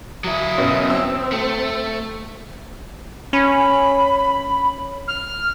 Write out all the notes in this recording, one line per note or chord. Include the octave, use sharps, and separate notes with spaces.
F#3 E4 D#6
F#2 B2
C4 E6
A3
C#4 B5
F6